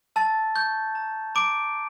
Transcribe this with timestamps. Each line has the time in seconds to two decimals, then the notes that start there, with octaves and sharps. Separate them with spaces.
0.16 A5 E6 A6
0.55 C#6 G6
0.95 A#5
1.35 A#5 D6 D7